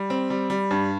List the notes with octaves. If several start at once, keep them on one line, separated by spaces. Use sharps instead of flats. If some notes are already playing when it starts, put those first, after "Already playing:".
Already playing: G3
C4
G3
G3
G2